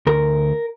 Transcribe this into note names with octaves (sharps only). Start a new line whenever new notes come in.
D2 A#4